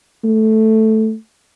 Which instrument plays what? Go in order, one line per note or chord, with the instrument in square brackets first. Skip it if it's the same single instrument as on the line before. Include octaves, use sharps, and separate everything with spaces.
[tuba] A3